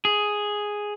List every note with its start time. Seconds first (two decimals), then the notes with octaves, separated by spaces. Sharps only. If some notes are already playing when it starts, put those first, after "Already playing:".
0.05 G#4